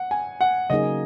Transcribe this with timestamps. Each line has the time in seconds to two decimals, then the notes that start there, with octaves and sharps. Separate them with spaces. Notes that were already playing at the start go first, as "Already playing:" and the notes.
Already playing: F#5
0.11 G#5
0.41 F#5
0.70 C#3 F#3 A#3 D#4 G#4 D#5